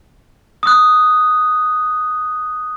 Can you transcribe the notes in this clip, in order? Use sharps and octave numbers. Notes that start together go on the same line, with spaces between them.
D#6 F#6